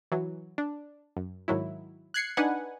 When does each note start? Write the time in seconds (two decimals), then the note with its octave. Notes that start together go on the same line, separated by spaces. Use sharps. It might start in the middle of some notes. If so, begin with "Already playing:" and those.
0.12 E3 F#3
0.58 D4
1.17 F#2
1.48 G#2 D#3 F#3 E4
2.14 F#6 G#6 C7 C#7
2.37 D4 D#4 B4 F#5 G#5